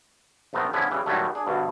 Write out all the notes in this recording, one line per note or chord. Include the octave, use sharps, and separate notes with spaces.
A#1 A3 B3 C4 A#4 A#5
D3 F3 B3 C#4 E4
C#3 E3 G3
A#2 D#3 E3 F#3 G3 A3
D4 G#4
D2 G2 B2